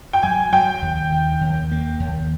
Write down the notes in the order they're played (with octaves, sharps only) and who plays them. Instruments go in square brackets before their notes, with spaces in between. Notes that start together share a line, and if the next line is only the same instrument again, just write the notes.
[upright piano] G5
[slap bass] F#3 [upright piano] G#5
[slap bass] F#3 [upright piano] G5
[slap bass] D#2
D#3
D#2
A#3
D#2